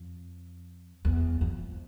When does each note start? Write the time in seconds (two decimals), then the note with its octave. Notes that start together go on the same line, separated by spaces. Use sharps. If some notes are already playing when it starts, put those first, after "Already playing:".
Already playing: F2
1.05 E2
1.41 F2